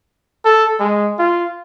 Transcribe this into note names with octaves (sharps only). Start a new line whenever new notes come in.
A4
G#3
F4